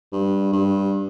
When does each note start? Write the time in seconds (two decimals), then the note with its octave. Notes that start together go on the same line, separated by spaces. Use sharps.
0.12 G2
0.52 G2